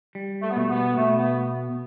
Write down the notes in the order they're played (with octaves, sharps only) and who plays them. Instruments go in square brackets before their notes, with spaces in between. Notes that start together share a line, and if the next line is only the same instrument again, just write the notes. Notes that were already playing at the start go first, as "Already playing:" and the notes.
[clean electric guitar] G3
[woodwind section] A3
B3
[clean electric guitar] B2 [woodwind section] A3
[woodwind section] B3
[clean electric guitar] B2 [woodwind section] A3
[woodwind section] B3